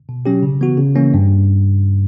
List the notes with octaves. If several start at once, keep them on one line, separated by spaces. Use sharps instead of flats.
B2
F#3 C#4 G4
C#3
E3 B3 F#4
C#3
E3 A#3 C#4
G2